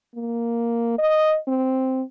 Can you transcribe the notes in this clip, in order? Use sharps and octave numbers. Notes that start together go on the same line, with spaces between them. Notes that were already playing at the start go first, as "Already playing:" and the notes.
A#3
D#5
C4